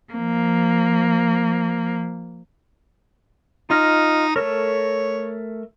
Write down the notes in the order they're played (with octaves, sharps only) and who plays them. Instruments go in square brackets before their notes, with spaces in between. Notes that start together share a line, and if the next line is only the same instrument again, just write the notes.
[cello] F3 A#3
[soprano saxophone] D#4 [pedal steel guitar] F4 D#5 F6
[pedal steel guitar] A3 A4 A#4 [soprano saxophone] C#5